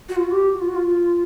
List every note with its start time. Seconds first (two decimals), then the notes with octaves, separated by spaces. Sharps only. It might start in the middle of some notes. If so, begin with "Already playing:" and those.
0.09 F#4
0.16 F4
0.24 F#4
0.31 G4
0.53 F#4
0.61 F4
0.68 F#4
0.75 F4